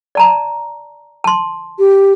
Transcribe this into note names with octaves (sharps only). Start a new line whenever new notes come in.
D5 A5 A#5
A5 C6
G4